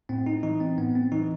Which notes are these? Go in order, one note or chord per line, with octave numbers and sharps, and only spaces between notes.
A2 C4
D#4
E3 D#4
C4
A2 B3
C4
E3 D#4